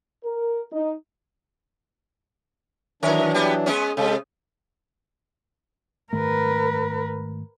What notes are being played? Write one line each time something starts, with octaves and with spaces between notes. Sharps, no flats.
A#4
D#4
D#3 E3 F#3 D4 A#4 C#5
G3 B3 G4
G#3 B3 C#4
C3 G#3 A4
G#2 D#3 A3 A#4 B4